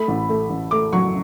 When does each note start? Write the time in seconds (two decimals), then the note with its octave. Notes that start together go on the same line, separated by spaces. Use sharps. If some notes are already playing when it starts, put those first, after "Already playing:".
Already playing: A3 B5
0.08 A1
0.29 A3
0.50 A1
0.71 A3 D6
0.93 F#3 C#6